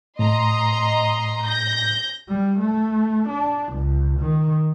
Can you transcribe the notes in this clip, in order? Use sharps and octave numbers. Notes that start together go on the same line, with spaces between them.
A2 D#5 A#5 C6
G6 A#6
G3
A3
D4
C#2
D#3